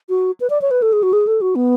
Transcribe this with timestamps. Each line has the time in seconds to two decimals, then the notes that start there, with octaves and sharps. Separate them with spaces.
0.09 F#4
0.40 B4
0.50 D5
0.62 C#5
0.71 B4
0.82 A4
0.93 G#4
1.03 F#4
1.13 G#4
1.27 A4
1.41 F#4
1.56 B3